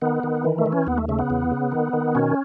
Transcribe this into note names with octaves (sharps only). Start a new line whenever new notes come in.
D#3 B3
D#3
E3
A3
E3
C#4
D#2 B3
A3
C#3 A3
B3
E2
C#3
D#3
D#3
B2 C#4